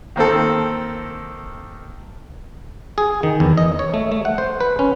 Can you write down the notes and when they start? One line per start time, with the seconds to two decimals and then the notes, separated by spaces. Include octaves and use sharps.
0.16 D#3 A#3 C4 A4
2.98 G#4
3.23 D#3
3.40 E2
3.57 D#5
3.79 C#5
3.94 A3
4.12 A3
4.25 F#5
4.38 C5
4.60 B4
4.79 C#4